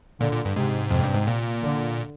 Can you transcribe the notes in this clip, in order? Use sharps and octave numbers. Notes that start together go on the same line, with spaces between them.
A#2 D3
A#2
G2
G#2 C3
F2 C3
G2
G#2
A#2
D3